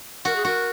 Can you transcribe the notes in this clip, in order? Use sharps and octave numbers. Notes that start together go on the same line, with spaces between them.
F#4 A#4
G#4
F#4 A#4